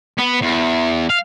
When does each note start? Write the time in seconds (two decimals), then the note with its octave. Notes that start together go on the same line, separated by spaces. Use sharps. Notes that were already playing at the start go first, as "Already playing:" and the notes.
0.18 B3
0.41 E2
1.10 F5